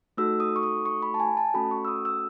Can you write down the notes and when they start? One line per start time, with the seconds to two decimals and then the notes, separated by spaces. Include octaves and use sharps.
0.17 A3 D#4 F#4 A4 E6
0.40 D#6
0.56 C#6
0.63 D#6
0.85 C#6
1.03 B5
1.14 A5
1.20 G#5
1.37 A5
1.54 A3 C#4 F#4 A4 B5
1.71 C#6
1.85 E6
1.88 D#6
2.05 E6